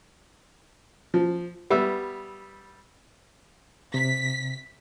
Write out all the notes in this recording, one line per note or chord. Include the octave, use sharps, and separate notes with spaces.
F3
G3 B3 E5
C3 B6